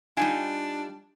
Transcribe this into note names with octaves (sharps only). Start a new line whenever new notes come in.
G3 D4 D#4 F4 F5 G#5